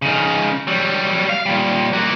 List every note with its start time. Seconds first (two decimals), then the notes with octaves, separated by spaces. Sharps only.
0.02 C#3 D#4
0.67 F#3 G3
1.29 F5
1.46 A#2 G3
1.93 A#3 F#4